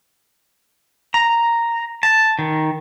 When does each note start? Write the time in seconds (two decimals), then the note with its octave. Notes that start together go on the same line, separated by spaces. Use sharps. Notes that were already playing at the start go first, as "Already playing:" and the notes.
1.14 A#5
2.03 A5
2.39 D#3